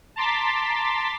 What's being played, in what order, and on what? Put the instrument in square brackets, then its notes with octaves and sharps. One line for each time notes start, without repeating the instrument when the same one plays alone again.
[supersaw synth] A5 A#5 C6 D6 A6 B6